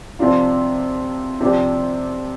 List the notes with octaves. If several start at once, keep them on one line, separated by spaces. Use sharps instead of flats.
C3 F3 D4 F4
C3 F3 D4 G4